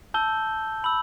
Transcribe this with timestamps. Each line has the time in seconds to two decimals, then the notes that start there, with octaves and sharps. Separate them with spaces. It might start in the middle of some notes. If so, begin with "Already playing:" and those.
0.14 A5 E6 G6 G7
0.84 B5 E6 F#7